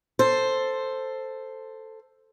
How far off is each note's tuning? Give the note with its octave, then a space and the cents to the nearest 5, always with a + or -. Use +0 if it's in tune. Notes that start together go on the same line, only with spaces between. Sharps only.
A4 +10 C5 +0